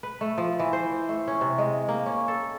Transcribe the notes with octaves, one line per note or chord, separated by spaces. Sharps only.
B4
A3
F3
E3
C5
A3
C#4
C3
G#3
A#3
C#4
A4